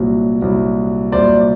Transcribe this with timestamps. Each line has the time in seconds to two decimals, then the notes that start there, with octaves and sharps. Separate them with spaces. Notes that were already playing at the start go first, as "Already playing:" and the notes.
Already playing: C2 A#2 F#3
0.42 C2 A#2 F#3
1.12 C2 A#2 F#3 C5 D5